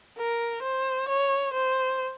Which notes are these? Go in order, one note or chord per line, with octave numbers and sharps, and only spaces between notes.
A#4
C5
C#5
C5